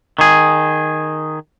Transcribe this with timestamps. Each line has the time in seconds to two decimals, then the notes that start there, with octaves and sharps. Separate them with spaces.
0.19 D#3 G#4